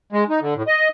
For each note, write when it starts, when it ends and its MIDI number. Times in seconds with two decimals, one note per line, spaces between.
0.12 0.24 56
0.29 0.40 63
0.41 0.54 50
0.55 0.63 45
0.67 0.89 75